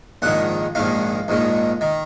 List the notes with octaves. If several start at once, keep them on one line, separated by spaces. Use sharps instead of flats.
A#1 G#2 D#3 F#5
A#1 G#2 D#3 F5
A#1 G#2 D#3
D#3